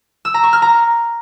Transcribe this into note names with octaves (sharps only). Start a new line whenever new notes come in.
E6
A#5
C#6
F6
A#5